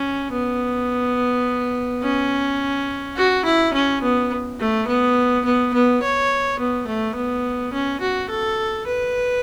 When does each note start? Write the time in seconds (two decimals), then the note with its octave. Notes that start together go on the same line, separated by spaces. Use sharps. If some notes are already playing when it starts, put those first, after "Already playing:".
Already playing: C#4
0.32 B3
2.02 C#4
3.16 F#4
3.45 E4
3.74 C#4
4.02 B3
4.60 A3
4.88 B3
5.45 B3
5.74 B3
6.02 C#5
6.60 B3
6.87 A3
7.15 B3
7.73 C#4
8.01 F#4
8.30 A4
8.87 B4